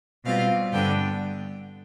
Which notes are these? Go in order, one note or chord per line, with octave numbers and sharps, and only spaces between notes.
B2 G3 C4 F4 F5
G2 D3 G3 B3 D4 G5